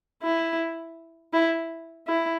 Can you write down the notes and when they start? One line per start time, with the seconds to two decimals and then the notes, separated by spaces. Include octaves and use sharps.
0.23 E4
1.33 E4
2.07 E4